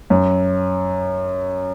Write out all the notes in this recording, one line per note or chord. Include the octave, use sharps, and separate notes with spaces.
F#2